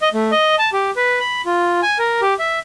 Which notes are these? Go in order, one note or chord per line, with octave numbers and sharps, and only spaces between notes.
D#5
A3
D#5
A5
G4
B4
B5
F4
G#5
A#4
G4
E5